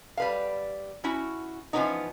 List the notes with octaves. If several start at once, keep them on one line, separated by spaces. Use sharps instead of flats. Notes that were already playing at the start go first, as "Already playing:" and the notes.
G3 B4 F5
C#4 E4 F#4
E3 F3 G#3 B3 C#4 D#4